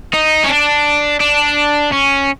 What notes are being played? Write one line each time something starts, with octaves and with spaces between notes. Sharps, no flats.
D#4
C#4
D4
D4
C#4